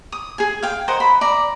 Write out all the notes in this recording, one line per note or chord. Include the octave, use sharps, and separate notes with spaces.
D#6
G#4 G#5
F5 G5
A#4 C5 D#5 F#5
B5
D5 A#5